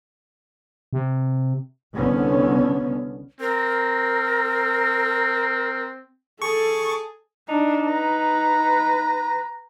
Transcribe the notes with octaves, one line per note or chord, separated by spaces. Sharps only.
C3
C2 D3 B3 C#4
C4 A#4
G#4 A4 A5 C#6
D4 D#4
B4 A#5